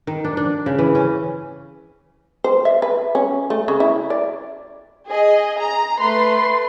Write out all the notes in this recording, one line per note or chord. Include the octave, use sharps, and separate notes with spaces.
D#3
D4
D4
C#3
E3
C#4
C5
E5
B4
C#4
A3
C#3
E4
D5
G#4 D#5
A#5
A3 B4 C6